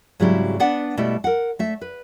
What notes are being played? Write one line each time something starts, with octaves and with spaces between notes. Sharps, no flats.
G#2 C#3 F#3 G3 C4 E4
B3 D4 B4 F#5
B2 G3 A3 E4
A#4 F#5
A3 E5
B4